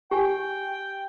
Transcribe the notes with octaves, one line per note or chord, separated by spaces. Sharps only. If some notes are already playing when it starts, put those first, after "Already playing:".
G4 G5 G#5